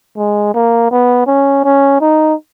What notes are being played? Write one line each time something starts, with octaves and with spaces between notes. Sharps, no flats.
G#3
A#3
B3
C#4
C#4
D#4